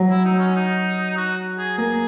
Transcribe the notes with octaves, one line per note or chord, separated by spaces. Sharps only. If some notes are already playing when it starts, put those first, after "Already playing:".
Already playing: F#3
E4
D#4
C#4
D#4
F#4
G#4
A#3 G#4